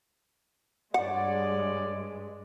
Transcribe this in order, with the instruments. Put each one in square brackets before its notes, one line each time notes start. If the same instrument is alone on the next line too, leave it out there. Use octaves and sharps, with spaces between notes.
[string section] G2 G#3 [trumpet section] C#5 D5 [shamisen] F#5